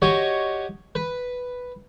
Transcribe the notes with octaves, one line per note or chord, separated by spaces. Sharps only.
F#4 G4 C#5 D#5
B4